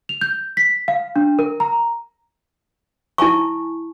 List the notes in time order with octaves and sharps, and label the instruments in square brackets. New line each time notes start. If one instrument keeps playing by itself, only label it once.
[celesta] F7
G6
B6
F5
D4
A#4
A#5
[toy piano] E4 G#5 A5 C#6